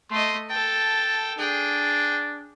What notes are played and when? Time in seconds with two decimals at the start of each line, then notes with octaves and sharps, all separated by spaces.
0.11 A3 D#5 C6
0.50 A4 G5 A5
1.39 D4 G#4 G5